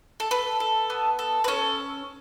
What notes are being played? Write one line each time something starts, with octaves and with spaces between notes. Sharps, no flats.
A4
A4 B4
A4
B3
A4
B4
C#4 A4